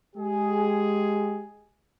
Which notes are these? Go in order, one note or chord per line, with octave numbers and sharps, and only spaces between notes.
G#3 G4 G#4